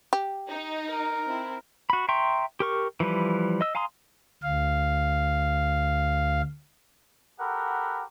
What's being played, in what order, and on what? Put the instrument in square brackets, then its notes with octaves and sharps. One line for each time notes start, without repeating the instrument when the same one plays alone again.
[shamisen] G4
[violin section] D#4
[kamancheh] A#4
[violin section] C4 E4
[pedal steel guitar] F#4 B5
E5 G5 A#5 C6 C#6
G4 A#4 C#6
E3 F3 G3 B4
D#5 E6
F5 G#5 A#5 C6 D#6
[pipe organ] D2 F5
[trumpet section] F#4 G4 A4 A#4 F#5 B5